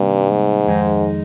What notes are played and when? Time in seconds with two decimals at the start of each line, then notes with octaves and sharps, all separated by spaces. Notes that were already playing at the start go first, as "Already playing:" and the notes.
Already playing: C2 G2 C3 D#3 G3 A#3
0.30 G#2
0.67 F2 D#3 G#3 D#4